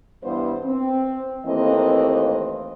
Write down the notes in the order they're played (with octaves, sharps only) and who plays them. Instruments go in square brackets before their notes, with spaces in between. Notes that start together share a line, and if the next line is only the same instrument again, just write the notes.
[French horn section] G2 E3 B3 C5
C4
D#2 E3 A3 A#3 C4 D#5